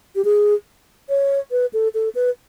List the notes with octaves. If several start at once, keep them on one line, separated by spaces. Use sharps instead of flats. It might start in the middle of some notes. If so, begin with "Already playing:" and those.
G4
G#4
C#5
B4
A4
A4
B4